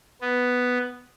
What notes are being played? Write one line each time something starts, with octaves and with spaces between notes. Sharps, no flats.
B3